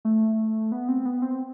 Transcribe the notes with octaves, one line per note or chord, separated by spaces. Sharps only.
A3
B3
C4
B3
C4